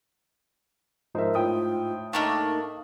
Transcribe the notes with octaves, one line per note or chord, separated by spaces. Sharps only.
G#2 F3 D#4 A#4 C5 E5
A2 F4 G5 D#6
A3 A#3 D4 D#4 D#5 F5